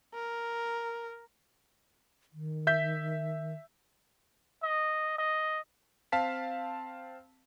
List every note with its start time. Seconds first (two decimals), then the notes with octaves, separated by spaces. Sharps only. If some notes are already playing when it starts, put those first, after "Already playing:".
0.14 A#4
2.33 D#3
2.67 E5 G6 B6
4.63 D#5
5.18 D#5
6.12 C4 F5 A5 B6